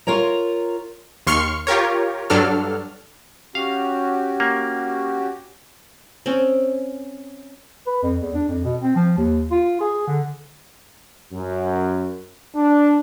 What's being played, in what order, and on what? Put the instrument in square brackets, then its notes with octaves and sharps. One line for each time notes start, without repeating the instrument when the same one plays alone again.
[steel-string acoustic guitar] F4 A#4 C#5 A#5
[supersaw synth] D#2 C6 C#6 F6 C#7
F4 G4 A#4 C#5
G2 F#3 D4 A4 F6
[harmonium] C#4 F#4 G4 [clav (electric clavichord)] F5
[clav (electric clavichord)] A#3
[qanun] C4 C#4
[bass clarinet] B4
F2
E2
D4
F2
B2
C4
F3
D#2
F4
G#4
D3
[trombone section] F#2
D4